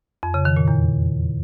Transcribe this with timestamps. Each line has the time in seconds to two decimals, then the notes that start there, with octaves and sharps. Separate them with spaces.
0.23 F2
0.34 C#3
0.45 D#3
0.56 A#2
0.68 E2